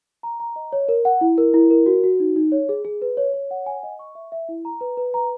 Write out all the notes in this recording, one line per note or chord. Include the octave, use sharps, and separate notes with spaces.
A#5
A#5
D#5
C#5
A#4
F#5
E4
A#4
E4
A#4
F#4
F#4
D#4
D#4
C#5
G#4
G#4
B4
C#5
C#5
F#5
G#5
D#5
C#6
E5
E5
E4
A#5
B4
B4
A#5